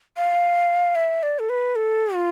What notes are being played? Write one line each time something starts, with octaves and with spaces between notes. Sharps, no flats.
F5
E5
D5
A4
B4
A4
F4